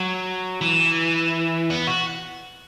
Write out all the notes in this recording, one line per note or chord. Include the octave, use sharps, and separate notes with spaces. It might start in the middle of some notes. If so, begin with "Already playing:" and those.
Already playing: F#3
E3
B3
F#4